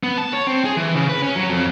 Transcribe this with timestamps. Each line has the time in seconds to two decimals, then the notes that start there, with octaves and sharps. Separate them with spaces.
0.03 B3
0.18 A5
0.33 C#5
0.47 C4
0.65 G#4
0.77 E3
0.96 C#3
1.09 B4
1.22 C#4
1.36 F#3
1.49 F2